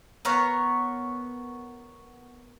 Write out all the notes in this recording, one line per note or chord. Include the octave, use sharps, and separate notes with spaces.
B3 A#4 C#5